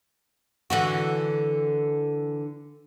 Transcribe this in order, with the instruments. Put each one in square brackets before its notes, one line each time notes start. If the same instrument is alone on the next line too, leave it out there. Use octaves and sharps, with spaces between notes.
[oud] D3 E3 F#4